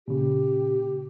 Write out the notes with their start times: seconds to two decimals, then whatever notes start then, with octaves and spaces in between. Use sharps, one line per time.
0.08 A#2 C#3 G4